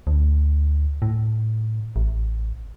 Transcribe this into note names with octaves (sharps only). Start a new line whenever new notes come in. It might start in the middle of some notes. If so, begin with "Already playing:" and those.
D2
A2
A1